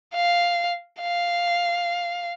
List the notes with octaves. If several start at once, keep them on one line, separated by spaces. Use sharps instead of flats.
F5
F5